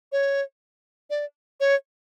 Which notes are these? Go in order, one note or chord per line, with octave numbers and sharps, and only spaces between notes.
C#5
D5
C#5